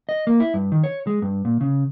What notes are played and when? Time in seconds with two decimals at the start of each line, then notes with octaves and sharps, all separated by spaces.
0.09 D#5
0.27 A#3
0.40 E4
0.54 G2
0.72 D#3
0.83 C#5
1.07 G#3
1.22 G2
1.45 A#2
1.61 C#3